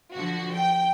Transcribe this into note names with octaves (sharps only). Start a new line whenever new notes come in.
D3 F3 F#4
G5